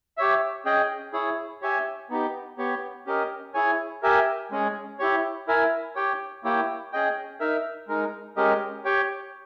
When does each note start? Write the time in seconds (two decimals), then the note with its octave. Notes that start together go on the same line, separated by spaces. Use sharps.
0.18 G4 C#5 E5
0.65 C#4 G#4 D#5 G5
1.13 E4 G#4 C#5
1.62 G4 C#5 E5 G#5
2.10 B3 D#4 G4
2.58 B3 G4 C#5
3.07 C#4 G4 A#4 D#5
3.54 E4 G#4 C#5 G#5
4.03 G4 A#4 E5 G#5
4.51 G#3 C#4 G#4
4.99 E4 G4 C#5
5.47 E4 A#4 E5 G#5
5.96 G4 C#5 G5
6.44 A#3 E4 G4 C#5 G5
6.92 C#4 G#4 D#5 G5
7.40 D#4 A#4 E5
7.88 G#3 D#4 A#4
8.37 G#3 C#4 G4 A#4 D#5
8.85 G4 C#5 G5